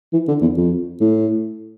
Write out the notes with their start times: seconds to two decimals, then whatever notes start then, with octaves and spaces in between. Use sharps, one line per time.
0.13 E3
0.28 D3
0.42 E2
0.57 F2
1.00 A2